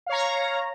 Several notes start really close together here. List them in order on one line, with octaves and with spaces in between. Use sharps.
F5 C#5 A#5